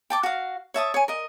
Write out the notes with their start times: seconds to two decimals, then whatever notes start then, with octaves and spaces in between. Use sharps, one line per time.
0.10 G5 A5 D6
0.23 F#4 F5
0.74 C#5 E5 A5 D#6
0.94 C#5 G#5
1.08 A#4 D#5